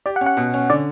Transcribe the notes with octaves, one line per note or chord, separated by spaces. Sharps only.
G4 D5
F#5
C#4
F#5
B2
C#4
D3 D5